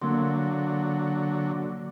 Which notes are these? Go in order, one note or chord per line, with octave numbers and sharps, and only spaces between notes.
D3 F#3 A#3 C6